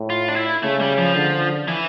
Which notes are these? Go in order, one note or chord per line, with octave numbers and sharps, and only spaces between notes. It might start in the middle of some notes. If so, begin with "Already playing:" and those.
Already playing: A2
F4
D4
E4
C#3 A3
G3
F3
D3
E3